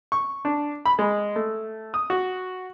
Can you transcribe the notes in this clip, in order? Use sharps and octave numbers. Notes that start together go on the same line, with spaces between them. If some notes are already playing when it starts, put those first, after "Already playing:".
C#6
D4
B5
G#3
A3
D#6
F#4